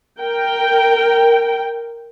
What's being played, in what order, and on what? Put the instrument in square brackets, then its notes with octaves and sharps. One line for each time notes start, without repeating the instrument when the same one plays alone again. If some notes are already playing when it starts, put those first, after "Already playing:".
[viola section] A#4 G5